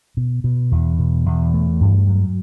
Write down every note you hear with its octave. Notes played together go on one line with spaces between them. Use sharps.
B2
B2
E2
B2
E2
A3
G2
F#3